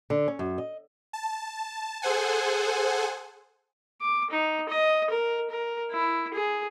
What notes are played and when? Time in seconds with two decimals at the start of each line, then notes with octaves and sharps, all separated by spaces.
0.10 D3
0.28 C#4
0.39 F#2
0.58 D#5
1.13 A5
2.02 G#4 A4 C5 F#5 G#5
4.01 D6
4.30 D#4
4.69 D#5
5.10 A#4
5.50 A#4
5.91 E4
6.33 G#4